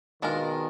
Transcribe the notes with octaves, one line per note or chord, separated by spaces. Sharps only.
B2 D#3 G#3 D4 F4 A#4